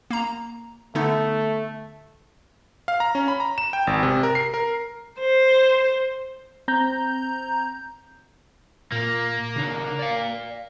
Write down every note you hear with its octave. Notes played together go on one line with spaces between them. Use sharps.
A#3 A#5
D3 A3 B3 D#4
F5
A#5
C#4
B5
A#5
E7
G5
G#1
C3
A#4
C7
A#4
C5
C4 A#5 G6
A#2 A#3
C#3 D4 D#4
D5 F5